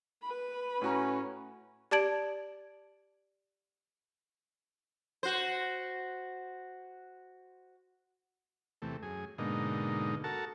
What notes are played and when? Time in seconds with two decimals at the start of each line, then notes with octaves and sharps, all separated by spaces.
0.22 B4 B5
0.82 A2 C#4 F#4 A#5
1.91 G4 D5 A5 G#6 D7 F#7
5.23 F#4 C5
8.82 E2 C3 A3
9.03 F#2 G#4
9.38 G#2 B2 D3 A#3 D#4
10.24 F#4 A4 A#4 A5